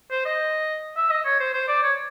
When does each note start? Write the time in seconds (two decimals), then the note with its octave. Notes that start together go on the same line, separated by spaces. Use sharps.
0.11 C5
0.26 D#5
0.97 E5
1.10 D#5
1.25 C#5
1.40 C5
1.54 C5
1.68 D5
1.83 C#5